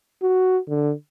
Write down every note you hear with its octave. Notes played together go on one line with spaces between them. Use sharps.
F#4
D3